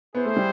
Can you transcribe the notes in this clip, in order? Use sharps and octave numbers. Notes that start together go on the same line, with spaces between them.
B3 E4 G#4 C5
A3
G3